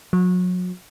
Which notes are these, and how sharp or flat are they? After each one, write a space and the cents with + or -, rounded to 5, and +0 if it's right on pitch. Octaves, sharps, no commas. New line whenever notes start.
F#3 -35